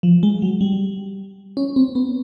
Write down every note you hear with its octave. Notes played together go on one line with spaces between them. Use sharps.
F3
G#3
F#3
G3
C#4
C4
B3